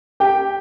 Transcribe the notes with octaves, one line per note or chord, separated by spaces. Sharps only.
G4 G5